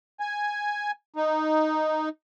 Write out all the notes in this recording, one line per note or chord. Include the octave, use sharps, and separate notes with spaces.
G#5
D#4